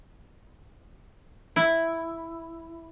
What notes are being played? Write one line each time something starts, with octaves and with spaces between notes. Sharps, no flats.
E4